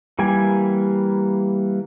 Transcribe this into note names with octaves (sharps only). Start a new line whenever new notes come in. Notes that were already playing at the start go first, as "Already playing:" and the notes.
E3 G3 A#3 G#5